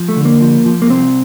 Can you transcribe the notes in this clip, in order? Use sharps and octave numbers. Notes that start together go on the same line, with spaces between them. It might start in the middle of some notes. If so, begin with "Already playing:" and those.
Already playing: F3
A3
D3
A#3
F3
F3
A#3
C2 C4